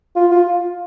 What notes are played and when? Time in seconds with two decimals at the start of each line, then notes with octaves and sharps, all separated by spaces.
0.16 F4
0.31 F4